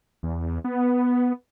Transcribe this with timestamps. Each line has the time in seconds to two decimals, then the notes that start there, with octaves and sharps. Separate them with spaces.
0.23 E2
0.64 B3